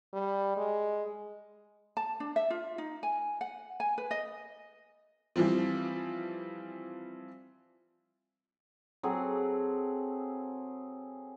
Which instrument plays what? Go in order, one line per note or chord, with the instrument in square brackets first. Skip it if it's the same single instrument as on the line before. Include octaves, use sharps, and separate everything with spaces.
[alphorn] G3
G#3
[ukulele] A5
D4
E5
F4
D#4
G#5
F#5
G#5
B4
D#5
[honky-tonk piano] E3 F3 G3 C4
[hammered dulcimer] F#3 C4 G#4 A4